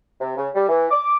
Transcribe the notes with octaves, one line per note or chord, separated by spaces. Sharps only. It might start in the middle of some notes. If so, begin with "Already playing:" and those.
C3
C#3
G3
E3
D6